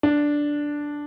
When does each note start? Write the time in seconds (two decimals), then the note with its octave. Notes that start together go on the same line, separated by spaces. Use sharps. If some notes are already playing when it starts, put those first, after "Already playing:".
0.03 D4